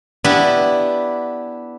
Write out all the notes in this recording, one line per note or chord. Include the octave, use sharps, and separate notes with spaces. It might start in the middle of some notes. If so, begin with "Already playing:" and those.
B3 D4 E4 G4